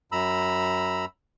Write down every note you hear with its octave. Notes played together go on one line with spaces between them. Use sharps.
F#2 A#5 B5 E6